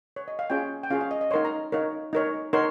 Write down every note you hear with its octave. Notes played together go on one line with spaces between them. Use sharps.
C#5
D#5
F5
C#4 F4 G#4 C#5 G5
G5
C#4 F4 G#4 C#5 F5
F5
D#5
D#5
D#4 A#4 C#5 C6
A#5
D#4 A#4 C#5
D#4 A#4 C#5
D#4 A#4 C#5 C6